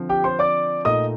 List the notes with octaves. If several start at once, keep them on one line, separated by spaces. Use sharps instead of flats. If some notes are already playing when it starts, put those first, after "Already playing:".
Already playing: D3 F3 C4
G4 G5
C5 C6
D5 D6
A#2 A3 D#4 D#5 D#6